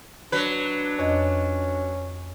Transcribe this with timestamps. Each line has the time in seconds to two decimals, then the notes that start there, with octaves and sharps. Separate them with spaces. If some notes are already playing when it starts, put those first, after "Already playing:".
0.32 F#3 D4 B4
0.99 F2 C#4 C#5 D#5